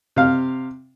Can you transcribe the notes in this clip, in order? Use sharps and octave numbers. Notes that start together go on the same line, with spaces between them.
C3 F5